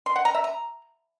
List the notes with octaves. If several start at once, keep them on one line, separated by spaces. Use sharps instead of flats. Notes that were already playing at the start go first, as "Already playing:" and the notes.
C6
F#5
A#5
E5
A#5